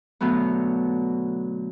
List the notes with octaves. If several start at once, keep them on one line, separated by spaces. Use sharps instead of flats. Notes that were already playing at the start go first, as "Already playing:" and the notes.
B2 D3 F#3 A3 B3